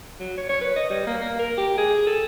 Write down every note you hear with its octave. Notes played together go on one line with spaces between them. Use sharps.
F#3
C#5
C#5
B4
D#5
G3
A#3
A#3
A#4
G4
G#4
A4